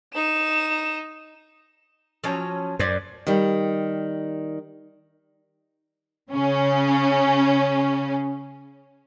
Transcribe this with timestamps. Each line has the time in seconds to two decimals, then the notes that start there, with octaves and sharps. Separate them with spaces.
0.15 D#4 E7
2.24 F3 F#3 C#4
2.79 F#2 C5 D5
3.27 D#3 G3
6.31 C#3 C#4